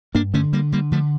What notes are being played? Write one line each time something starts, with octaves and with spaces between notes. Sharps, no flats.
G2 A#3 D4
D3 A3 C#4
D3 G3 A#3
D3 G3 A#3
D3 F3 A3